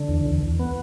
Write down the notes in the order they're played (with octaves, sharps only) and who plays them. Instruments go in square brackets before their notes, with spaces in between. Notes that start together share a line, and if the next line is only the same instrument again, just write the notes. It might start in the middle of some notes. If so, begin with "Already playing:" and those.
Already playing: [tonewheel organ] D3
E2
E2
E2
B3